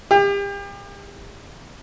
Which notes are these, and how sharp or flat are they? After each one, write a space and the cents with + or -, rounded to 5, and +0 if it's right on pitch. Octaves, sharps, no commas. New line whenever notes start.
G4 +35